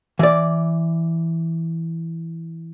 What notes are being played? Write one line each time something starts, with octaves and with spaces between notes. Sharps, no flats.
E3 D5